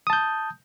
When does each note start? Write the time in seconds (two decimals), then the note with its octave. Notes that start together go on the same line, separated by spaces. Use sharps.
0.07 D#6
0.10 A5
0.13 G6